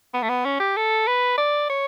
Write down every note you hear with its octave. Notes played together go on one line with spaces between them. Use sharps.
B3
A3
B3
C#4
G4
A4
B4
D5
C#5